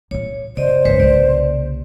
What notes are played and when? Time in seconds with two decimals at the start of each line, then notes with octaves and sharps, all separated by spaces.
0.11 A#2 F4 C#5
0.57 F#2 C#3 C5 D5 D#5
0.85 G#1 F#2 G#3 B4 C#5
1.00 C2 A#2 D5